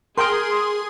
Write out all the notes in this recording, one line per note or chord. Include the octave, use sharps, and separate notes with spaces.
G#4 A#4 G5 C6 D#6